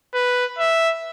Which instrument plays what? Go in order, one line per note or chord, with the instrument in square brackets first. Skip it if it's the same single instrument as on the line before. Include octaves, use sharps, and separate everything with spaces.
[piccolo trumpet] B4
E5